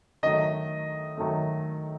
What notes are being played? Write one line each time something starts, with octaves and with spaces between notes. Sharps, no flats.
D#3 F#3 A3 D#5
D#3 F#3 A3